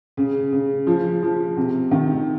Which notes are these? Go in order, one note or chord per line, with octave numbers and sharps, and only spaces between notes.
C#3
C#3
F3
F3
C3
D#3